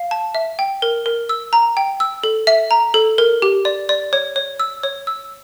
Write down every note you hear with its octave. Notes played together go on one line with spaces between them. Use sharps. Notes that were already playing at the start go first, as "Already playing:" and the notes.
Already playing: F5
A5
E5
G5
A#4
A#4
E6
A#5
G5
E6
A4
E5
A#5
A4
A#4
G4
D5
D5
C#5
C#5
E6
C#5
E6